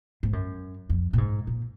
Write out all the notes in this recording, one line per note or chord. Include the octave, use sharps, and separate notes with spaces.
G#2
F#2
F2
A#2
G#2
A#2